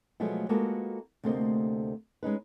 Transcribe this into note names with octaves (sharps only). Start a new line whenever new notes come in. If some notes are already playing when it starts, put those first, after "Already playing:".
B2 F3 F#3 G#3 A3 B3
G#3 A#3 B3 F4 F#4 A4
D2 C3 A3 A#3 C5 D#5
G#3 C#4 D#4 B4